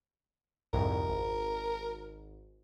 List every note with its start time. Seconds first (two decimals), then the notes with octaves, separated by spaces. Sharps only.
0.73 C2 F2 G#2 A#4
1.08 G#1